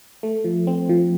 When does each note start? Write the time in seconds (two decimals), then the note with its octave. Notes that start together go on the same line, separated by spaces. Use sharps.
0.23 A3
0.44 F3
0.67 C4
0.89 F3